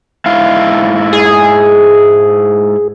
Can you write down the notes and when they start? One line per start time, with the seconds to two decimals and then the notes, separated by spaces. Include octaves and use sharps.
0.26 G#2 E4 F5
1.13 G#4